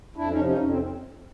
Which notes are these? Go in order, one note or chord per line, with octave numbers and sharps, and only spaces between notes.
F2 D4 E4
C#4 D#4
C3 F3
C#4 D#4
F2
C4